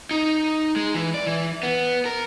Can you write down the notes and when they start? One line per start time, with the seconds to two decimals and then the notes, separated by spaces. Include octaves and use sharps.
0.11 D#4
0.76 G#3
0.94 E3
1.14 D5
1.26 E3
1.63 B3
2.05 A#4